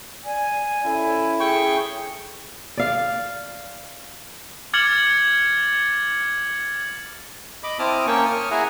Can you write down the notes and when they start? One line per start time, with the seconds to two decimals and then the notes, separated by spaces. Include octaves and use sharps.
0.25 D5 G#5
0.85 C#4 E4 A4
1.40 G#4 G5 C#6
2.77 D5 F5
4.73 D6 F6 G#6 A6 C#7 F#7
7.63 D#5 B5 D6
7.79 C4 E4 A5 D6 D#6 F6
8.07 A#3 C#4 G5 A5 C#6
8.26 C#6 D#6 F6
8.51 E4 G#4 E5 F#5 G#5 A#5